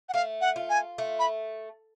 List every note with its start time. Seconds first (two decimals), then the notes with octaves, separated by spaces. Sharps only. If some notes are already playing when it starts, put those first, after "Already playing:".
0.09 F#5
0.14 A3 F5
0.41 F#5
0.56 F4
0.70 G#5
0.98 A3
1.19 B5